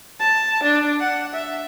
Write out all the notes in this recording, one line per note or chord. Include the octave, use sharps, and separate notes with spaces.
A5
D4
F#5
E5